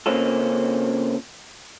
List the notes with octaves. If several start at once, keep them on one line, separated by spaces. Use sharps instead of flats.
C#3 A#3 C4 C#4 F4 A4